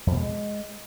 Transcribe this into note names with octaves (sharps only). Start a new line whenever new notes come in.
F2
B2
G#3